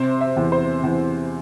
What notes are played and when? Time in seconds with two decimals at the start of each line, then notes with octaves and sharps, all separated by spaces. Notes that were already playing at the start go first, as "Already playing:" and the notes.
Already playing: C3 C5
0.21 E5
0.36 E2
0.52 C5
0.83 E2